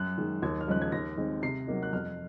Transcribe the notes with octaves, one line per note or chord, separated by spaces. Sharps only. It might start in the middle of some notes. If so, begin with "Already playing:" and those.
Already playing: F#2 F#6
D#3 G#3
D#2 G#6
F6
C#3 F3 G#3 D#4 F#6
G#6
D#2 A#6
D#3 G#3 C4
C3 C7
F#3 A#3 D#4
F#6
F2 F6